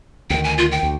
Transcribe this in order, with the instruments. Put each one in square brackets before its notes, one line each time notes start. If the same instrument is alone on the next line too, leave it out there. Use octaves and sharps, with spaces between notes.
[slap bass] D2 D#3 [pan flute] G5
[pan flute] G#5
F4
G5
[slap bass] D2